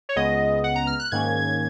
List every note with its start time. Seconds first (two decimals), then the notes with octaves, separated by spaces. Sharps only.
0.09 C#5
0.16 C#2 C#3 G#3 B3 D#5
0.64 F#5
0.76 A#5
0.87 F6
1.00 F#6
1.11 G#2 D#3 A#3 C#4 G#6